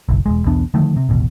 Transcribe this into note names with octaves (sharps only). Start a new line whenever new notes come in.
F#1 B1
E1 E2 G#3
B1 E2 B3 D4
D3 D#3 F3 A3
C3
D#1 A1 B2